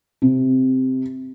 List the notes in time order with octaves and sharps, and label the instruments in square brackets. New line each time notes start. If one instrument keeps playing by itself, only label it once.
[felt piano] C3